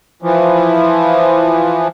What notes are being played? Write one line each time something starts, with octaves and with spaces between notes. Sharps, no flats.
E3 F3